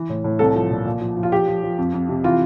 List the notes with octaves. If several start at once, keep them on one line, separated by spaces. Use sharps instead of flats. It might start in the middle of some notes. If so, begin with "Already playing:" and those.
Already playing: E3
A2
A2
C2 A4
F3
A#2
A#2
F3
F3
F4
F3 G4
F3
F3
F2
F2
C3
E3 F4